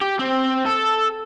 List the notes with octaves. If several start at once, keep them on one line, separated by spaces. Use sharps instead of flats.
G4
C4
A4